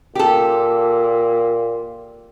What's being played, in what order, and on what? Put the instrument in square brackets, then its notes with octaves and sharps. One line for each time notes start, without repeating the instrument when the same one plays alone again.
[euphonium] A#2 [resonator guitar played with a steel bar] G4 A4